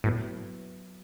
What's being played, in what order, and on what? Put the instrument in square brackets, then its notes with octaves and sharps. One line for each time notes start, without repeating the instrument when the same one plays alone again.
[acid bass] A2 [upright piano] F#3 B3 E4